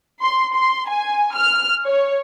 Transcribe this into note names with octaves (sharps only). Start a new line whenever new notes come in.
C6
C6
G#5
F6
C#5